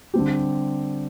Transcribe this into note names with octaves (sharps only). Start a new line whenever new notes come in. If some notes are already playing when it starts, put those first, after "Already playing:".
D3 G3 C4 G4